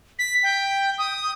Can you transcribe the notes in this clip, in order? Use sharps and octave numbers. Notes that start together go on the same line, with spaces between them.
B6
G5
D#6